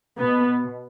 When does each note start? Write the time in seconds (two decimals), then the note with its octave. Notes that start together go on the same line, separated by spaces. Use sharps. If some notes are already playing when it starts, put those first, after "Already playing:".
0.19 B2 B3